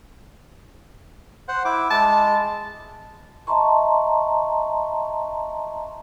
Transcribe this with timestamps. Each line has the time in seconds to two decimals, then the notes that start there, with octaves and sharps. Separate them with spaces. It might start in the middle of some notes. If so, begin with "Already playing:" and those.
1.48 C5 F#5
1.65 E4 D6
1.91 G#3 A5
3.47 D#5 E5 A5 A#5 C6 C#6